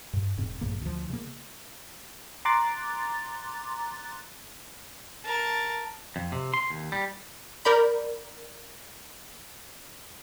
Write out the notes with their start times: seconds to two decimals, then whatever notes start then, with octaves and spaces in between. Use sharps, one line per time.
0.13 G2
0.37 E1 G#2 C#3 C4
0.61 A#1 G2 C#3 A#3
0.81 D2 F3
1.10 C#3 A#3
2.45 A#5 C6 D6 F#6 A6
5.25 A#4 A5
6.16 F2
6.32 C3
6.54 C6
6.70 D#2
6.92 G3
7.65 A#4 D5 B5 G6